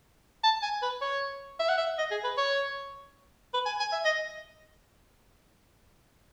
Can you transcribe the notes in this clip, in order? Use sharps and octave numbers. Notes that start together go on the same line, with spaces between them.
A5
G#5
B4
C#5
E5
F#5
E5
D#5
G#4
B4
C#5
B4
G#5
G#5
E5
D#5